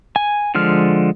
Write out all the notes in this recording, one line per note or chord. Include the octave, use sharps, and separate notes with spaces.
G#5
D3 F3 G#3 F6